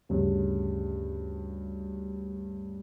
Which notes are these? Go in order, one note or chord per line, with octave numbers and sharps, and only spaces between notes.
D2 G2 C#3